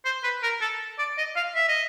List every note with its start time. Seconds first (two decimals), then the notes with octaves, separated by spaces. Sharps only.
0.05 C5
0.23 B4
0.43 A#4
0.61 A4
0.99 D5
1.18 D#5
1.36 F5
1.55 E5
1.68 D#5